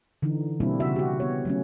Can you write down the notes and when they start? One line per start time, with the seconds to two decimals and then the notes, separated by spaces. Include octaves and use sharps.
0.22 D3 E3 D#4
0.60 B2 G3 A#3 C4 D4 E4
0.80 C#3 F#4 E5
0.96 F#4 G4
1.20 B3 C#5
1.45 F#3 A3 C#4